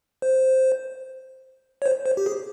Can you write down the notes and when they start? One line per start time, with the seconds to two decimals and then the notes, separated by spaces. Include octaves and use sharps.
0.22 C5
1.82 C#5
1.86 C5
2.06 C5
2.17 G4
2.26 G#4